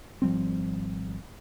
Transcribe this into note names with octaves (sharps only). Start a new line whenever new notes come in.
G#1 F3 G3 C4